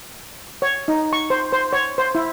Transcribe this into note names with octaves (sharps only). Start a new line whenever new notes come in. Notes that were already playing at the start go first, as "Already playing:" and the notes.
C#5
D#4
C#6
C5
C5
C#5
C5
E4